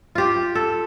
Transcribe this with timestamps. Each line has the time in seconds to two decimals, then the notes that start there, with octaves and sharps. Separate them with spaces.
0.15 F4 G4
0.55 A4